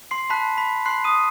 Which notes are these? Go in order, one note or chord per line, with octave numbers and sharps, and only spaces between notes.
C6 C7
A5 B5 C6 F#6 B6
B5 B6
B5 C6 F#6 C7
D#6 D#7